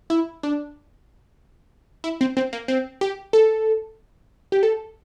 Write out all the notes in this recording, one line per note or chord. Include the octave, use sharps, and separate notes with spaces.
E4
D4
E4
C4
C4
A#3
C4
G4
A4
G4
A4